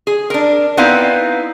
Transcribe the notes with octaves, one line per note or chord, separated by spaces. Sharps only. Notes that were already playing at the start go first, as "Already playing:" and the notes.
G#4
D4 A#4
B3 C4 D#4 E4 F5